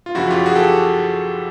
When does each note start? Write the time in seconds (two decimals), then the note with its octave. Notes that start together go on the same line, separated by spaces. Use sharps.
0.06 F4
0.15 F#2 C#3 F3 E4 F#4
0.30 F4 G4
0.46 F#4 G#4
0.55 G4 A4